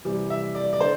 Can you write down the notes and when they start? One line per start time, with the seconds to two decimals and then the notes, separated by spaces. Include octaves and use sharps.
0.05 C3 E3 G3
0.30 E5
0.55 D5
0.73 D5
0.80 D3 C5